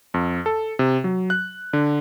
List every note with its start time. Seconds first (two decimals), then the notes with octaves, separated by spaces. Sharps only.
0.14 F2
0.46 A4
0.79 C3
1.04 F#3
1.30 F#6
1.73 D3